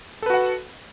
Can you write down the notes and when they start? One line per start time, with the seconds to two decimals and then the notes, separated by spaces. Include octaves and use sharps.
0.22 A4
0.26 B4
0.30 F#4
0.34 F#5